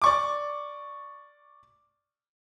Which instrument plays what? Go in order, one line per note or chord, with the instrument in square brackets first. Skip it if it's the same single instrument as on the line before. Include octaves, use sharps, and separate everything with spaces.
[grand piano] D5 C#6 D6